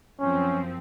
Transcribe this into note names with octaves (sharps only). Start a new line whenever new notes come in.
F#2 F3 C4 C#4